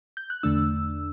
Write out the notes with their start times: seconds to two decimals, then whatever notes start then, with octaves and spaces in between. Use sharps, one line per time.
0.17 G6
0.30 F#6
0.43 E2 D3 A3 D4 E6